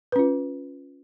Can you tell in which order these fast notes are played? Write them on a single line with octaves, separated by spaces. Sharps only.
B4 C#4 F4